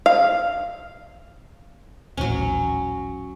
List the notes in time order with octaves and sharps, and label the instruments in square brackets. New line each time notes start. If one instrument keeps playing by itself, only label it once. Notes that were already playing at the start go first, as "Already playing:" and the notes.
[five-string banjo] F5
[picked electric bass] D#1 A1 [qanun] F#3 C#4